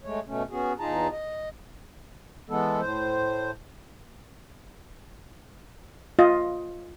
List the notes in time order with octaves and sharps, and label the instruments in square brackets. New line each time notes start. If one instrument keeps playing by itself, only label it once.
[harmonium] G#3 A3 C#5
B2 A3 C#4
B3 C#4 F#4 G#4
E2 D#4 F4 G#4 A5 A#5
D#5
E3 G#3 B3 A4
A2 C5
[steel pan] F4 D#5